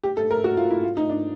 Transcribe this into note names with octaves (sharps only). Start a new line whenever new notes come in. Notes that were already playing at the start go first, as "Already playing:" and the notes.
G4
A4
A#4
F#4
F4
E4
F4
D#4
D4